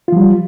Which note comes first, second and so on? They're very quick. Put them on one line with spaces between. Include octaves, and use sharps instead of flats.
F4 F3 G3